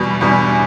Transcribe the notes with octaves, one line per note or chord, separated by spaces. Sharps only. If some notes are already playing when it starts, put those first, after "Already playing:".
Already playing: E2 B2 G3
E2 B2 G3